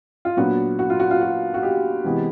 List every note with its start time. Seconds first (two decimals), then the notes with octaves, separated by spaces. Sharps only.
0.25 F4
0.37 A#2 F#3 B3 D4 F#4
0.79 F#4
0.90 F4
1.00 F#4
1.11 F4
1.21 F#4
1.54 F#4
1.63 G4
2.04 C3 E3 G#3 B3